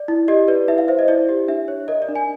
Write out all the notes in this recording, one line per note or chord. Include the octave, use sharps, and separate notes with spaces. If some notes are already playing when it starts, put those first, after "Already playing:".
Already playing: D5
E4
G4 D#5
B4 D5
E4 E5
F5
C5 E5
D#5
E4 D5
G4
D4 E5
C#5
A#4 D#5
D5
D4
G#5